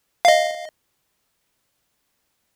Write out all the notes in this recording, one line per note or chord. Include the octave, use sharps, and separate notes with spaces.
D#5 F5